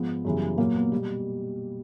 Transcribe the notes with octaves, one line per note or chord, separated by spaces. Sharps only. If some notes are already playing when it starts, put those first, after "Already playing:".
Already playing: G#2 F3 B3
F#2 C#3 E3 G3
A#2 F#3 A#3
B3
B2 G3